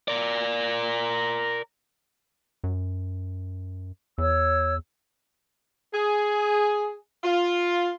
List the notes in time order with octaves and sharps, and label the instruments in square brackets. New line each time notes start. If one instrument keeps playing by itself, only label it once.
[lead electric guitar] A#4 D5
[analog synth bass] F#2
[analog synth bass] E2 [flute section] C#5 E6
[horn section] G#4
F4